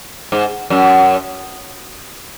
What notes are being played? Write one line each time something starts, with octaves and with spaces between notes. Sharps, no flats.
G#2
F#2